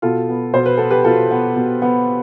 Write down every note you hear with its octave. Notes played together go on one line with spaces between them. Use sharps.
B2 F4 A4
B3
B2 C5
B4
B3 A4
G4 B4
B2 F4 A4
B3
B2
B3